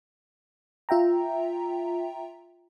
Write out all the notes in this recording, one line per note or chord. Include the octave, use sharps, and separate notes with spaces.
F4 E5 G5 A#5